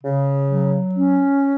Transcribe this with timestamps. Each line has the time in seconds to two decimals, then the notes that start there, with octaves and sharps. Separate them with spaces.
0.03 C#3
0.50 F#3
0.95 C#4